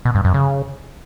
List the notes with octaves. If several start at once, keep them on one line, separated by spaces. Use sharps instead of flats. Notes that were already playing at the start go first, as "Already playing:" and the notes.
B2
G2
F#2
C#3